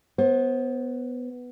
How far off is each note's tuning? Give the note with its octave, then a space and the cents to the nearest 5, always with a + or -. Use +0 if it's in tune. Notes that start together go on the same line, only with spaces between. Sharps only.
B3 +5 C5 +35